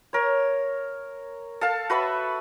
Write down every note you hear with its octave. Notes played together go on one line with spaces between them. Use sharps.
A#4 C#5
A4 F5 A5
F#4 B4 E5 B5